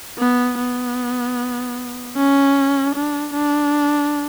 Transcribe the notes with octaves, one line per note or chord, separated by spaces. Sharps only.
B3
B3
C#4
D4
D4